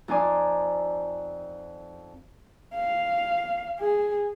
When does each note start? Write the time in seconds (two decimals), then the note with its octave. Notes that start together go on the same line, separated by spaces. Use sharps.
0.08 F2 D#4 C5 D5 G#5 D6
2.74 F5
3.79 G#4